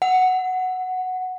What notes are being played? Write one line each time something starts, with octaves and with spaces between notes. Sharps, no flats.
F#5